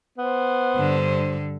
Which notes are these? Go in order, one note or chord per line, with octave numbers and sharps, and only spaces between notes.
B3 C5
G2 D3